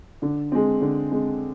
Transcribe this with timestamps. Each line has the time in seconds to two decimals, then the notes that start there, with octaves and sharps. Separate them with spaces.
0.22 D3
0.52 G#3 C4
0.81 D3
1.11 G#3 C4